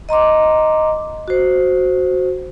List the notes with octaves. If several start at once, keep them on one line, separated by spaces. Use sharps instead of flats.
D#5 A#5 C6 D6
F#4 C5